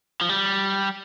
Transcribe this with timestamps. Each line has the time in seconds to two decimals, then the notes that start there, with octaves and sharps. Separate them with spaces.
0.21 F3
0.29 G3